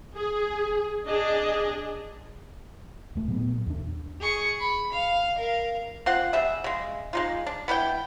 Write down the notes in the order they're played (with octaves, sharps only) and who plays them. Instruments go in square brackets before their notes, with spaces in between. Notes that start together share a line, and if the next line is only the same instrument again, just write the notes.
[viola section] G#4
D4 G#4 D#5
[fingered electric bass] D#1 A3
A#2 F#3 B3
D#2 D4
[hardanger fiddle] G#4 C#6
B5
F5
A#4 F5
[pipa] C4 F4 F#5
G3 G#4 E5
C#3 G#3
G#3 D#4 F4
D4
B3 E4 B4 G5